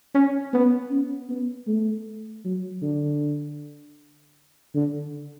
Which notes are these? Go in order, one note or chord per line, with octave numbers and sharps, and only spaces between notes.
C#4
B3
C#4
B3
A3
F#3
D3
D3